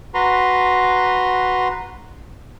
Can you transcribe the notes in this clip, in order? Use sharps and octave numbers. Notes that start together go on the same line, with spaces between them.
F#4 B4 A#5 C6